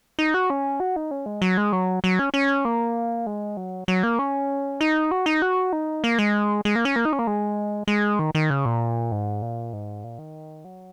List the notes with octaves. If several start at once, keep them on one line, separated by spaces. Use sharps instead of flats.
D#4
F#4
C#4
F#4
D#4
C#4
G#3
F#3
G#3
F#3
F#3
C#4
C#4
A#3
G#3
F#3
F#3
A#3
C#4
D#4
F#4
D#4
F#4
D#4
A#3
G#3
G#3
A#3
C#4
A#3
D#4
C#4
A#3
G#3
G#3
D#3
D#3
C#3
A#2
G#2
A#2
G#2
A#2
D#3
F#3